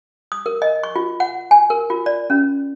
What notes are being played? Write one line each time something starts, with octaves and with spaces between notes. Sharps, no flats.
D#6
A#4
D#5
C#6
F4
F#5
G#5
A#4
F4
D5
C#4